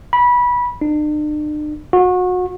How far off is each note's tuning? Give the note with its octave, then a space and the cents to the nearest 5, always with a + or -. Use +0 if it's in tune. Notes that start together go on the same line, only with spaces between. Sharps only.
B5 -20
D4 +45
F#4 -30